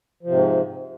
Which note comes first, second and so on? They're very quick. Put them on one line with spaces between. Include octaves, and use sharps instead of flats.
F3 C3 G#2